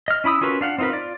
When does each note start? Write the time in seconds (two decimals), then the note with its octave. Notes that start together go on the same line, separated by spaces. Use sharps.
0.08 D#5 F6
0.24 C#4 E4 B5 D#6 E6
0.41 C#4 F4 F#4 A#4 B4
0.61 D4 F5 F#5
0.78 C4 D#4 F4 A#4 B4
0.90 F4 D5